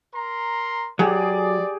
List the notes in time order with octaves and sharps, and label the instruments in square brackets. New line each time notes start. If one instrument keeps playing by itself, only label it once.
[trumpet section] A#4 A#5 C6
[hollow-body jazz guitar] F#3 [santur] G4 G#4 [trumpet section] D5